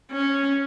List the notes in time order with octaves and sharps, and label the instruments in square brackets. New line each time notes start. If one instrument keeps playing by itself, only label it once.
[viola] C#4